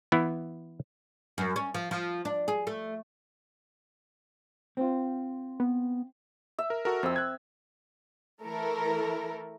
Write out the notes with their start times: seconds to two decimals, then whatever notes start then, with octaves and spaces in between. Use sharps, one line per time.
0.12 E3 B3 E4
1.38 F#2
1.56 C#4
1.75 F3
1.91 F3
2.25 D4
2.48 G#4
2.67 A3
4.77 C4 F4
5.60 B3
6.59 E5
6.70 A#4
6.85 F#4 A4 A#4
7.03 F2 C4 E6
7.16 F#6 G#6
8.41 E3 A3 E4 A4 A#4